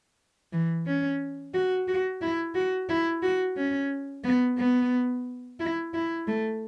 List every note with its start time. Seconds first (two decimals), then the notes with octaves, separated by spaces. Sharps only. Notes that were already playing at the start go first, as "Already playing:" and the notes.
0.53 E3
0.86 C#4
1.54 F#4
1.88 F#4
2.22 E4
2.55 F#4
2.89 E4
3.23 F#4
3.57 C#4
4.24 B3
4.58 B3
5.60 E4
5.94 E4
6.28 A3